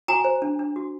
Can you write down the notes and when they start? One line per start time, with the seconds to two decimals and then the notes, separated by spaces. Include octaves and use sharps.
0.08 F#4 G#5 A#5
0.24 C5
0.42 D4
0.59 D4
0.76 F#4